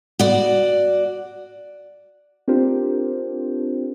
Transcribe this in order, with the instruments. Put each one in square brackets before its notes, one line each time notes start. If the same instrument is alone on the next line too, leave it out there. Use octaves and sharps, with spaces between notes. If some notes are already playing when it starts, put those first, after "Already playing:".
[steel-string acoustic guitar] F#4 D5
[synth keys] C4 D4 F4 G4 A#4 C5